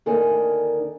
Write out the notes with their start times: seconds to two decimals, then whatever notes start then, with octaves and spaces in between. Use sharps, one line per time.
0.06 D2 D3 D#3 A#3 D5 G#5